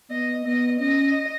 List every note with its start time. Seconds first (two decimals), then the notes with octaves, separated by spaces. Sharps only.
0.10 B3 D#5
0.45 B3 D#5
0.80 C#4 D#5